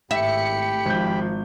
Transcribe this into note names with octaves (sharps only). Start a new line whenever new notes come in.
G#1 A2 G4 E5 B5 C#7
G#1 F3 G6